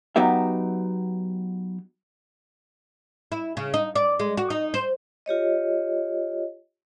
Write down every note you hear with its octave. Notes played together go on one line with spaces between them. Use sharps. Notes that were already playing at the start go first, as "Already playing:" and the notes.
F#3 B3 D#4 G4 E5
E4
C#3
D#4
D5
G#3
F#4
D#4
C5
F4 G4 C#5 D#5